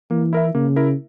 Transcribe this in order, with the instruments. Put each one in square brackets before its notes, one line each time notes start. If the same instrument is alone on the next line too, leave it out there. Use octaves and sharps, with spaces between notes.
[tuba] E3 [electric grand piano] A#3
[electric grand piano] E4 A#4 E5
[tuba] C#3 [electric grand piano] A#3
[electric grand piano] E4 A#4 E5